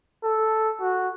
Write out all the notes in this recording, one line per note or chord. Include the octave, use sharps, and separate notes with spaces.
A4
F#4